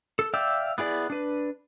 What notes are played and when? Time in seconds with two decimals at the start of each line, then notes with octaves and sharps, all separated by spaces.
0.19 A4
0.34 D5 E5 F5 G5 E6
0.78 B3 E4 G#4 D5
1.10 D4 B4